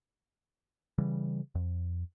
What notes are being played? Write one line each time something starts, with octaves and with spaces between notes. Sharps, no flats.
C#3 E3 G3
F2